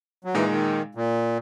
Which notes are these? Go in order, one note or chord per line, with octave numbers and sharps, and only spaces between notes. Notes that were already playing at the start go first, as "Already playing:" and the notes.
F#3
A#2 E3 G#3 D#4
D#3
A#2